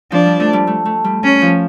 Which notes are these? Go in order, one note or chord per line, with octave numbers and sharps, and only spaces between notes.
F3 D4
G3
A3
G3
A3
A3
G3
G3 C#4
F3